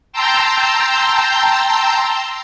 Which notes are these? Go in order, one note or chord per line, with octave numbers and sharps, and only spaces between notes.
G5 A5 A#5 C6 E6 G6